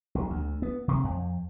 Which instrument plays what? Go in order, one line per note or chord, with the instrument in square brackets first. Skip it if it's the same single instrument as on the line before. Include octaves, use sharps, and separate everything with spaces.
[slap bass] B1
D2
B3
C3
F2